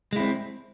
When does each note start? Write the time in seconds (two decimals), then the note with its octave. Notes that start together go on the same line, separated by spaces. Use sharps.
0.13 G#3
0.16 E4
0.20 C4